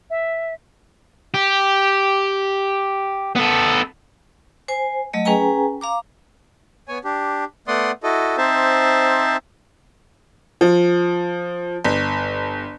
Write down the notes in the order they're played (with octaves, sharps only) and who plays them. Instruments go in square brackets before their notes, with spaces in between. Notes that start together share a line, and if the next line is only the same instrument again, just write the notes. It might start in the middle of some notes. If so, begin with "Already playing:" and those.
[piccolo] E5
[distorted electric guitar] G4
B3 A4
[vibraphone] C5 G#5
F#3 A3 D#5
C#4 G#4 B4 G5 G#5 A#5
F5 A#5 D6
[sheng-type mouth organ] B3 C#5 G#5
D4 G4
A3 B3 D5 F#5 C6 D#6
E4 F#4 A4 D#5
C4 D#4 C5 E5 A5
[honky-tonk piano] F3
G1